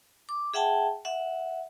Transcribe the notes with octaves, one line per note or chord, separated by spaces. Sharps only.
D6
G#4 E5 F#5 G5 A5
E5 F#5